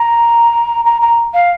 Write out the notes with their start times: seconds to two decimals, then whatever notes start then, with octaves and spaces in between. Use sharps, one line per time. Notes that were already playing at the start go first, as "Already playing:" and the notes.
Already playing: A#5
0.85 A#5
1.02 A#5
1.34 F5